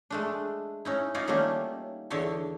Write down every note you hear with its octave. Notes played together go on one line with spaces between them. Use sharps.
G#3 A3 D4
C#4 D#4 E4
C#4 D#4 F4 C#5 D5
D#3 G3 A3 A#3 C#4
E2 D3 C#5 E5 A5